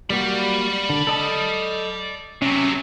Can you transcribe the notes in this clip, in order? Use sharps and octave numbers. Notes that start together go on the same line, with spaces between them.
G3 A#3 F#4 D5 B5
D3
A4 D#5 A5
C3 F#3 C#4